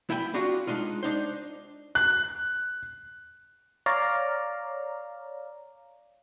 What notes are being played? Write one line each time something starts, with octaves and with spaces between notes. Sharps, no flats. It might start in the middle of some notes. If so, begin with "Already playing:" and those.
E4 E5 G5 G#5 B5
C4 D4 F4 F#4
G#3 A#3 D4 D#4 F4
D4 D#4 C5
F#6
C#5 D5 F5 A#5